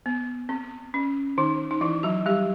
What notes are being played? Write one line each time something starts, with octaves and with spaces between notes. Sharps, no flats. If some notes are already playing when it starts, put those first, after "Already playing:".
B3
C4
C#4
D#3 D#4
D#4
E3 E4
F#3 F#4
G3 G4